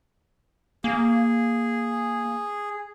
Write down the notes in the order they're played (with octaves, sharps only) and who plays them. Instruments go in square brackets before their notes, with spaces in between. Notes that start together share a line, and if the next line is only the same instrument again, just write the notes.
[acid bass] A#3 [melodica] G#4